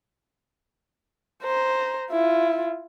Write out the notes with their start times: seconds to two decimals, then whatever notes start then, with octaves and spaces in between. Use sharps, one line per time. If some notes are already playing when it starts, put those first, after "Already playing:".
1.42 C5 A#5
2.11 E4 F4